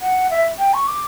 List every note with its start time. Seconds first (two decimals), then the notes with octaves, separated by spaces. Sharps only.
0.01 F#5
0.30 E5
0.59 G5
0.74 C#6
0.88 D6